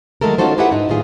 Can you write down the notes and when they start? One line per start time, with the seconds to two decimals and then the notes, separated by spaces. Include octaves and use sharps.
0.21 D#3 F#3 G#3 A3 A4 A#4
0.38 C#4 D#4 F4 F#4 A4 C5
0.58 E4 G4 G#4 B4 E5 F#5
0.71 G#2 D#4
0.89 A2 D#3 A#3 F4 G#4